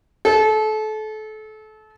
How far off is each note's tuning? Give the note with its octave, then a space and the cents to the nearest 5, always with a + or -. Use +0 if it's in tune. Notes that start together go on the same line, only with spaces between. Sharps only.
A4 -30